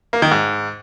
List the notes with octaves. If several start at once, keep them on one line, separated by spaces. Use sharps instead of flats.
A#3
D#3
G#2